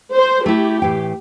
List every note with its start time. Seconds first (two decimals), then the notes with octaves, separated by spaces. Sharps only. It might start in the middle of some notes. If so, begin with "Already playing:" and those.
0.13 C5
0.46 A3 E4 G4
0.82 A2 E3 G5